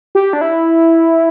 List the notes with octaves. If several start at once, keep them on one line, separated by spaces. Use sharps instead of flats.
G4
D4
E4